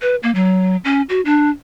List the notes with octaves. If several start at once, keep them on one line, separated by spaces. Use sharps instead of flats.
B4
A#3
F#3
C#4
F#4
D4